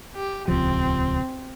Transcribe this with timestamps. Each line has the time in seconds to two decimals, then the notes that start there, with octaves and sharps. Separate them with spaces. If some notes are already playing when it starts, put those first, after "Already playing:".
0.16 G4
0.48 D#1 C#2 F3 C4